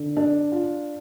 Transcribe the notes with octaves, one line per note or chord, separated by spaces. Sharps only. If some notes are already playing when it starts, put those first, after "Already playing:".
Already playing: D3
D4
F4